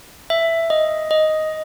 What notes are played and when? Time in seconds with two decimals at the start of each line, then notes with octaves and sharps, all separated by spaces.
0.30 E5
0.70 D#5
1.11 D#5